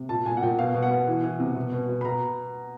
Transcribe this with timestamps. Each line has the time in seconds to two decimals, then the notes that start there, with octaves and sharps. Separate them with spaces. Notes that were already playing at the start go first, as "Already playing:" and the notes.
Already playing: C3
0.09 A#2 A5
0.26 A#2 G#5
0.37 F#5
0.42 A#2 G5
0.59 B2 F5
0.75 B2
0.83 F#5
0.91 B2
1.07 E3
1.24 E3
1.40 C3
1.56 B2
1.72 B2
1.89 B2
2.01 B5
2.05 B2 A#5